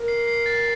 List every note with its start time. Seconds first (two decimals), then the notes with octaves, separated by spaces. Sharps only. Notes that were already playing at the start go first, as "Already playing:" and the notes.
Already playing: A#4
0.08 C7
0.28 C7
0.46 A6